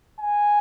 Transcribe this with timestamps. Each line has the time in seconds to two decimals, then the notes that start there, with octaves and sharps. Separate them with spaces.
0.20 G#5